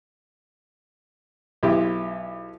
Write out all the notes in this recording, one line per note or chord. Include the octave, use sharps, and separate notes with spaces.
B1 E4 G4